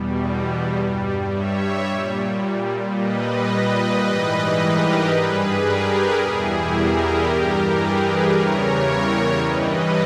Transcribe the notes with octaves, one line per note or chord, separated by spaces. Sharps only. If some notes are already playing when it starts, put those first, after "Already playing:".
Already playing: E2 B2 G3
G2 G3
C#5 E5
A#2 G3
A#2 G3 B4 D#5
B4 D#5
G#2 E3 G3
G4 A#4
G2 G3 G#4 B4
G4 A#4
E2 B2 G3 E4 G#4
G4 A#4
G2 E3 G3
G#4 B4
E2 C#3 E3 G3 A#4 C#5
G2 E3 G3 B4 D#5